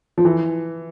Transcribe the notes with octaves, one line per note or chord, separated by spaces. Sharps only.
F3
E3